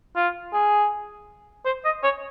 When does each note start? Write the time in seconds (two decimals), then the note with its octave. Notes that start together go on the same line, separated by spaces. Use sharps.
0.16 F4
0.53 G#4
1.65 C5
1.84 D#5
2.03 C#5